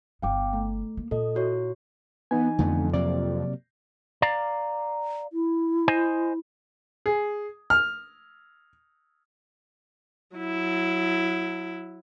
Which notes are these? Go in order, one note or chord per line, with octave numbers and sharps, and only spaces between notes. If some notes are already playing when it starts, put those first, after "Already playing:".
G1 B3 F5 G5 D6
A3
A#3
A#2 A4 D#5
E4 F#4 C#5
E3 B3 D#4 G#5
F2 D3 A3 B3
C3 F#3 A#3 D5
D5 F5 A#5
E4
C5 D#5 G#5
G#4
F6
F#3 E4